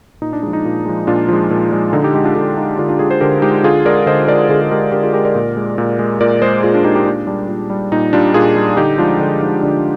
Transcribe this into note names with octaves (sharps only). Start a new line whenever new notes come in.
A#2 D#4
D4
F3 G#3 D#4
D#4
A#2
F3 G#3
A#2 D4 F4
F3 G#3
A#2
F3 G#3
D3 D#4
D#4 G4
G#3 D#4 G4
D4 F4
D3 D#4
G#3 D#4
D3 D4 F4
D4 F4
G#3 F4 G#4
G#4 C5
D3 G4 A#4
G#3 D#4 G4
D3 F4 G#4
G#3 A#4 D5
D3 C5 D#5
G#3 A#4 D5
D3 F4 G#4
G#4
G#3 G4 A#4
D3 G4 A#4
F4 G#4
G#3 G4 A#4
A#4 D5
A#2
G#3
A#2
G#3
A#2 A#4 D5
G#3 G#4 C5
A#2 F4 G#4
D4 F4
G#3 D#4 G4
D#4 G4
A#2 D4
G3 D4
A#2
G3
A#2 D#4
G3 D4 F4
A#2 F4 G#4
G3
D3 D#4 G4
F3 G#3 D4 F4
D3 D4
F3 G#3 D#4
D3 D4